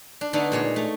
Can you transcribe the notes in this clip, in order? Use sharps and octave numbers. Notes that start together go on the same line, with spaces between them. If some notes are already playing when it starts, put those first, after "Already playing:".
D4
D3 A3 B3 D4 D#4
A#2 G#3 C#5
A3